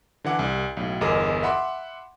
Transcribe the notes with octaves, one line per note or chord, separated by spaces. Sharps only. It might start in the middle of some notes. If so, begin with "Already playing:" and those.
D3 E3 F#5 D6
C2
B1 A2
G1 E2 G#4 A#4 D#5 D6
E5 F#5 B5 C6 D6